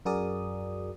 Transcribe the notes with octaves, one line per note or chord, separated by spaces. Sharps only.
F#2 F#4 G#4 A#4 D5 D#6